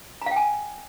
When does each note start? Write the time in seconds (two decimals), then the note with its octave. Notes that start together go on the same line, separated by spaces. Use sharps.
0.22 A#5
0.26 F5
0.31 G5
0.36 G#5